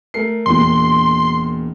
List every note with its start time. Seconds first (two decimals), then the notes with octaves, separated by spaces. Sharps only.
0.14 A3 A#4 C7
0.46 E1 A#2 C6